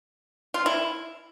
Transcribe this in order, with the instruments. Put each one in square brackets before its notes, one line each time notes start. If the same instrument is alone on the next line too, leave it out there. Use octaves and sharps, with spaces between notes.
[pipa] F4
E4